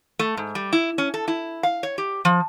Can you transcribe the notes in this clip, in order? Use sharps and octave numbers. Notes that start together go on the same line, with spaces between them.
A3
G#2
G3
E4
C#4
A4
E4
F5
C#5
G4
F3